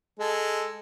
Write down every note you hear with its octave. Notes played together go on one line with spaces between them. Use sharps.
G#3 A4